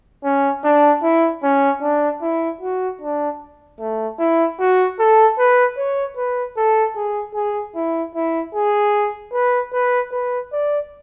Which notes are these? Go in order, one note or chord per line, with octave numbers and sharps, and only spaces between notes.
C#4
D4
E4
C#4
D4
E4
F#4
D4
A3
E4
F#4
A4
B4
C#5
B4
A4
G#4
G#4
E4
E4
G#4
B4
B4
B4
D5